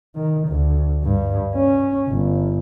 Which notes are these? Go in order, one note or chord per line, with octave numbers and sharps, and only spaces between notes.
D#3
D2
G2
C#4
G1